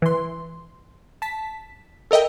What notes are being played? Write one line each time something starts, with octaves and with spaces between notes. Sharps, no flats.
E3 C6
A5 B6
A4 A#4 D#5 E5 G5